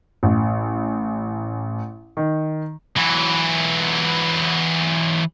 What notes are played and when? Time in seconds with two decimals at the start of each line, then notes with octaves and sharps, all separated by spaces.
0.23 A1
2.17 D#3
2.97 E3 F#3